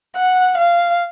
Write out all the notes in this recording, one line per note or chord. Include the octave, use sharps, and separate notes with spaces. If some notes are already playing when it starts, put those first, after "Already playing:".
F#5
F5